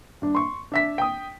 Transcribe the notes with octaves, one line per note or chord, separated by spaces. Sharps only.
G2 D4
C6 C#6
D4 E5 B6
G5 D#6